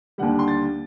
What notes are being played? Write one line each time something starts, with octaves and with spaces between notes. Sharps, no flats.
D#2 D3 G3 F#5
C6
A6